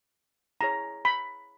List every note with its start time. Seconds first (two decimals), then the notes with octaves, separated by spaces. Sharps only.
0.61 E4 G#4 C#5 A#5
1.05 B5